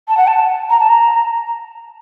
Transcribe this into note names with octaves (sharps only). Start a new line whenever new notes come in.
A5
F#5
A5
A#5
A5
A#5